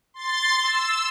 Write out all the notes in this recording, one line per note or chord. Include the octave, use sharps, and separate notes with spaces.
C6 A6
E6